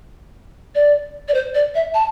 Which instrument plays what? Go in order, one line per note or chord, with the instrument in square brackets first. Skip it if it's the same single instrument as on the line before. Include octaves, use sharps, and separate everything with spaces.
[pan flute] D5
D5
C5
D5
E5
A5